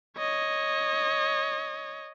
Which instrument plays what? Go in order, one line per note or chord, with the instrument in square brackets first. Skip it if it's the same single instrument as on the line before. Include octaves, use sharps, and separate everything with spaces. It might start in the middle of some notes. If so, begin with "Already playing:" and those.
[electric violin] C#5 D#5